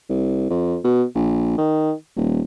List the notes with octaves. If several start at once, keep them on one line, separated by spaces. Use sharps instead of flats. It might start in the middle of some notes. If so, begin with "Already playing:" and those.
C2
F2
B2
A#1
D#3
D#1